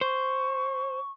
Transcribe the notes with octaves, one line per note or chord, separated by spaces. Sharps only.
C5 C#6